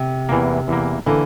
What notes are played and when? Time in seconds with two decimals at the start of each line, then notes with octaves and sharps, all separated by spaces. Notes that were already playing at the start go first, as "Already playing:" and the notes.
Already playing: C3
0.29 E2 E3 A#3
0.68 E2 E3 A#3
1.06 D3 E3 A#3